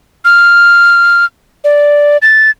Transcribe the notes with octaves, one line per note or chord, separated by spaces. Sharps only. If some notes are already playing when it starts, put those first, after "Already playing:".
F6
D5
A6